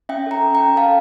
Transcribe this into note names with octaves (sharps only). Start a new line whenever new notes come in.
C#4 E5 G5
A4 G5 A#5
C#4
G5 A#5
C#4
A4 F5 A5